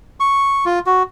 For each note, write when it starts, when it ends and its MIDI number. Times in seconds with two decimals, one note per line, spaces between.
0.20 0.64 85
0.65 0.79 65
0.86 1.03 66